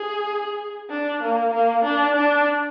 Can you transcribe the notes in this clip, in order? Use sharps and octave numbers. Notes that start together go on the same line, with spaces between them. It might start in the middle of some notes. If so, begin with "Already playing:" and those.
Already playing: G#4
D4
A#3
A#3
D4
D4